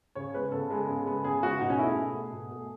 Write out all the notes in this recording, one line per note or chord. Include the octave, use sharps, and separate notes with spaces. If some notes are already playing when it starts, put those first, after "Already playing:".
C#3 C#5
G#3 B3 B4
C#3 A4
G#3 B3
C#3
G#3 B3
C#3 G#4
G#3 B3 F#4
B2 D#4
C#4
A3 E4
G#4
B2
A3
B2
A3